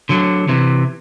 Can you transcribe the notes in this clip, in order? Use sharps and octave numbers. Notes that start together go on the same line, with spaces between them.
D3 F#3
C3 E3